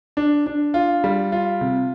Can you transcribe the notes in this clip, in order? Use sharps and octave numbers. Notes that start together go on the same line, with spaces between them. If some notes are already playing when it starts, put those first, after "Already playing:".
D4
D4
F4
G3
F4
C3